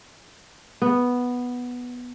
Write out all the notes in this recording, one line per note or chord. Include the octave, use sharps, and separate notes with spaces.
B3